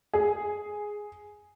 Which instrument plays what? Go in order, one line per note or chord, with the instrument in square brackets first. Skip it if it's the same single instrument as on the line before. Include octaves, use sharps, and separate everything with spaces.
[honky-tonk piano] G#4